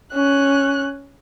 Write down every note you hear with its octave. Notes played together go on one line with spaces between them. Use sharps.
C#4 F#6